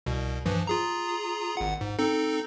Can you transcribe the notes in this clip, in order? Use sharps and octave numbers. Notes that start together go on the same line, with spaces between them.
C2 B2
G2 E3 F3
F4 G#4 A#5
G#1 F#5
G#2
C4 D#4 A4